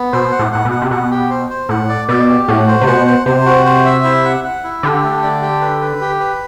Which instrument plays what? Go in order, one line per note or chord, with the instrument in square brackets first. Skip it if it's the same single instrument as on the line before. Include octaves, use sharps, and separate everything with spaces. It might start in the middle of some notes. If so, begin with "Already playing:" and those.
Already playing: [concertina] B3
[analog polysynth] B2 [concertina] C5
[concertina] F#5
[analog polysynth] A2
[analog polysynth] A2 [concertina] F#5
[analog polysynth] B2
[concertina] F#5
[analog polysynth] C3
[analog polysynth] B2 [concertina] F#5
[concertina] G4
C5
C5
[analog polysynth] A2 [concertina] F#5
[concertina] D5
[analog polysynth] B2 [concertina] D5
[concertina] G4
[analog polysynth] A2 [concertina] F#4
[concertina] C5
[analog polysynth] C3
[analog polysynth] B2 [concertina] F#5
[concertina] C5
[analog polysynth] C3 [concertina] C5
[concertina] F#4
C5
E5
E4
F#5
F#5
E4
[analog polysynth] D3 [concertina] G4
[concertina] A3
D4
G4
B4
B4
G4
B4